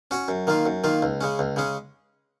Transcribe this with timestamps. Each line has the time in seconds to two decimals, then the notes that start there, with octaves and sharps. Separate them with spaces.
0.11 C#4 F#4 C#5
0.28 F#2
0.47 D#3 A#3 F4
0.66 F#2
0.84 D#3 A#3 F4
1.02 C#2
1.21 C#3 G#3 C#4
1.39 C#2
1.56 C#3 G#3 C#4